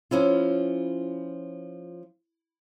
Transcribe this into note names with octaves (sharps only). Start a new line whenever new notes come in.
F3 C#4 E4 F4